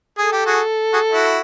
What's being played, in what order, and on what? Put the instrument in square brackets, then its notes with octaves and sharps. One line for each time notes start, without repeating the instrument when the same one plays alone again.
[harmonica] G#4 [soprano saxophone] A4
[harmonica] G4
F#4 G#4
F#4 G#4
E4 F#4